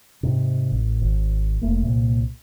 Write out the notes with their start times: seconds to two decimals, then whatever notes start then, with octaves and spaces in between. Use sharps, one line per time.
0.23 G#2 C3
0.72 A1
1.01 G#1
1.61 F1 A3 A#3
1.82 C2 A#2